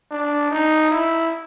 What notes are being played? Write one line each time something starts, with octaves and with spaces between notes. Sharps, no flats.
D4
D#4
E4